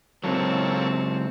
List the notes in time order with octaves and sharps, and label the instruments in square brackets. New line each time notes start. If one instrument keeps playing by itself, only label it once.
[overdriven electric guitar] C#2 F#3 [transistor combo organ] A#3 A4 C#5 [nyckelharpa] C4